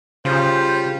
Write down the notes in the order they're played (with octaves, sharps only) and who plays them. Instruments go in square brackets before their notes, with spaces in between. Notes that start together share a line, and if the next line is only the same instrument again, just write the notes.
[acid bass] C#3 [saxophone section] G3 F4 [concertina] C5